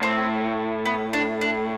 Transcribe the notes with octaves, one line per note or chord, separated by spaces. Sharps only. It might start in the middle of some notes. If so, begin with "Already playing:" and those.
A2 C4
B3
D4
D4